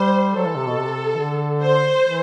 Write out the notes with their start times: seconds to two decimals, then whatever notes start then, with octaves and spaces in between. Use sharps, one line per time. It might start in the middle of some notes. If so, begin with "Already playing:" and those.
Already playing: G3 C5
0.35 F#3 A4
0.46 E3
0.56 C3
0.67 B2
0.78 C3
1.15 E3
1.19 D3
1.62 C5
2.04 E3